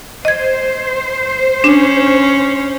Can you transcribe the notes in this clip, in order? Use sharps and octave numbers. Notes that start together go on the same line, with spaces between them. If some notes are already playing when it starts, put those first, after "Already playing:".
C5 D#5 G#6
C#4 D4